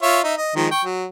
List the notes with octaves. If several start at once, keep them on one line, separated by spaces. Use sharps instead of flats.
F4 C#5 E5
D#4 E5
D#5
D#3 F3 G#3
G5 C#6
F#3